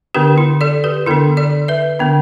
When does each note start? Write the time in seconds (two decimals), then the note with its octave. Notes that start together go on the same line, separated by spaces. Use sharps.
0.15 D3 B3 D4 G4 B4
0.38 E4
0.61 A4 D5
0.84 G4 B4
1.06 D3 B3 D4 E4 A4
1.37 A4 D5
1.68 B4 E5
1.99 D3 B3 D4